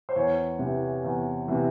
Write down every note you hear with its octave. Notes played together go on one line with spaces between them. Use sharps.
C5
E2 C#5
C3 E3
E2
C3 E3